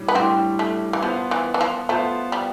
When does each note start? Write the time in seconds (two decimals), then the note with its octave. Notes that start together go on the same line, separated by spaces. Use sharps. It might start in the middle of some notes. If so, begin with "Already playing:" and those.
Already playing: A2 G3 D4
0.08 B3
0.15 A2 G3 C4 D4
0.59 A3
0.93 E3
1.02 F3 B3 F4 C5
1.31 E3
1.54 E3
1.61 F3
1.89 A3 B3 F4 C5
2.32 G3